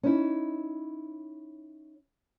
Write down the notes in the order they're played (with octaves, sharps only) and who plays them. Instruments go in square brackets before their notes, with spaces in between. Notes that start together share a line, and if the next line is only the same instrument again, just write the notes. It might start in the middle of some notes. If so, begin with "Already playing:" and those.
[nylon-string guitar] C#4 D#4 E4